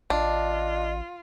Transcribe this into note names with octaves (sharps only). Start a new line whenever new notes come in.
A1 D4 F4 D#5